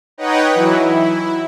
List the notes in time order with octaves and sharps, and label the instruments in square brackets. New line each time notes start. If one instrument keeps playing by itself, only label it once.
[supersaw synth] D#4 B4 C#5 D#5 F#5 G5
E3 F#3 E4
E4